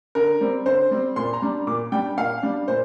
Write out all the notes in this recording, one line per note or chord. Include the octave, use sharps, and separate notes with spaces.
D3 A#4
G3 C4
D3 C5
G3 C4
A#2 C6
A#5
G3 D4
A#2 D6
G3 D4 G5
A#2 F5
G3 D4
A#2 C5